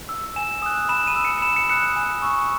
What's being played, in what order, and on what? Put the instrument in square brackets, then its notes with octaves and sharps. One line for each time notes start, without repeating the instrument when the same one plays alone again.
[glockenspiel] E6
G#5 E7
D#6 F#6
B5 E7
D#7
E6
C#7
B5 E7
C#7
D#6 F#6 C#7
G#5
C#6 E6